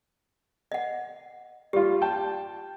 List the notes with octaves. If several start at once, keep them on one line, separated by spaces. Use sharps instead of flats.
D#5 F#5
G3 F4 G4
G5 A5